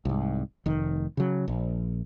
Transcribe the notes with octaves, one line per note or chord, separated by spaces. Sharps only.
C2 G#2
F1 D#3
C#3 F#3
A#1